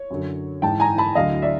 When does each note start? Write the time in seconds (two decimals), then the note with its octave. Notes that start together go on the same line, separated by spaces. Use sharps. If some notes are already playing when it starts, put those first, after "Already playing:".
Already playing: C#5
0.10 F#2 D3 F#3
0.62 G#2 E3 G5 A5
0.80 G#5 A#5
0.98 A5 B5
1.15 D2 D3 F#3 D#5 F5
1.42 D5 E5